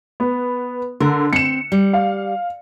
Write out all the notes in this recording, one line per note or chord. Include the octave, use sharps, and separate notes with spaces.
B3
D3 A#4
C4 C#7 E7
G3
F5